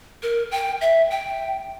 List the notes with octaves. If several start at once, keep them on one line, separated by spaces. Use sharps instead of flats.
A#4
G5
E5
G5